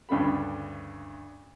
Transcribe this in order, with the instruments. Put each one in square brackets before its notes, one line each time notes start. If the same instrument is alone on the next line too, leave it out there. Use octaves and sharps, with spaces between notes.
[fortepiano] D2 G2 C#3 A3 B5